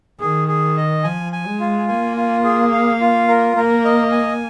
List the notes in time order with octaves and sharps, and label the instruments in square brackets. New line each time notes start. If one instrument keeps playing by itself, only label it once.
[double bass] D#3 [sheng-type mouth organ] G#4
[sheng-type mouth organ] G#4
D#5
[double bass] F3 [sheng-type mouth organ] G#5
[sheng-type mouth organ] G#5
[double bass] G#3
[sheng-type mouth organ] F4
[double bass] A#3 [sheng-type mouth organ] G#5
[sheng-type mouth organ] F4
G#4
F5
F4
A#4
[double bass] A#3 [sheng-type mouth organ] A#4
[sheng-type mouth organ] D#5
G#5